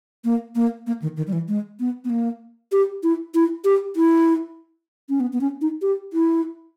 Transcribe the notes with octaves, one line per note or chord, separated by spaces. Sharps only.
A#3
A#3
A#3
D#3
D#3
G3
E3
G#3
B3
B3
A#3
G4
E4
E4
G4
E4
C#4
B3
B3
C#4
D#4
G4
E4